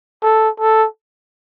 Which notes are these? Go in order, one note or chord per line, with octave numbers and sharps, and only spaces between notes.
A4
A4